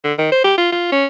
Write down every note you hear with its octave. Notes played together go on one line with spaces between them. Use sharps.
D3
D#3
C5
G4
F4
F4
C#4